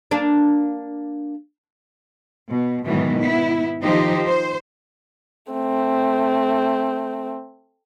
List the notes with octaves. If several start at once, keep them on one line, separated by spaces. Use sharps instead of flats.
A#3 D4
B2
G#2 B2 D#3 E3 F#3
B3 E4
D#3 F3 D#4 G4 C5
C5
A3 C4